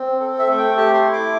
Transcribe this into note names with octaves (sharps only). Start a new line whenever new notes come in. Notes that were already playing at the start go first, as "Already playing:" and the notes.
Already playing: C4
A4
E5
A3
G5
G4 A5
C6
E4
D6